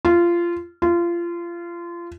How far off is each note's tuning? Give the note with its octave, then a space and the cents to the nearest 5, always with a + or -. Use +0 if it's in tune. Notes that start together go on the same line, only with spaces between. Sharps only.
F4 -20
F4 -25